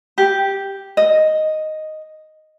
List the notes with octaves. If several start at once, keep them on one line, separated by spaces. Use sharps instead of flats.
G4
D#5